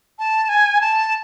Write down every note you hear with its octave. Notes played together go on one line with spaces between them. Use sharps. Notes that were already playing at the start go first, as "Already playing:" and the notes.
A5
G#5
A5